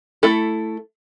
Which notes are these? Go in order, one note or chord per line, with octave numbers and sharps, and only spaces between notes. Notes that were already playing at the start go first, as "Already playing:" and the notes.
A3 E4 A4